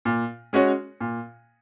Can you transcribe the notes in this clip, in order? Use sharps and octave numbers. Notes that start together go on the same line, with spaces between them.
A#2
G#3 C#4 F#4 C#5
A#2